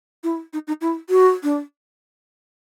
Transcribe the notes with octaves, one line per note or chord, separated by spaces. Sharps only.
E4
D#4
D#4
E4
F#4
D4